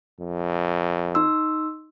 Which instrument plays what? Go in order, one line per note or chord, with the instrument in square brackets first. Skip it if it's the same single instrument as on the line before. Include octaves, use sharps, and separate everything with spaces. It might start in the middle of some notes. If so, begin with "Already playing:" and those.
[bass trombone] F2
[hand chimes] D#4 C6 E6